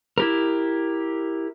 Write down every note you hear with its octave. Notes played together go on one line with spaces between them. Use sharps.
E4 G4 A#4